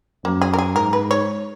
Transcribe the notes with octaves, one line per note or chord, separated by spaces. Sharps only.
F#2 A#3
G#4
A#4
G#4
G#2 A#4
B4
C#5